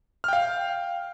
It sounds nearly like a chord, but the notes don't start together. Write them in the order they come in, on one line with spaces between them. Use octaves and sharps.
F6 G5 F5